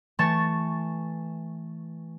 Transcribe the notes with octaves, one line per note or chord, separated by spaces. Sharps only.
E3 A3 A5 C#6 A6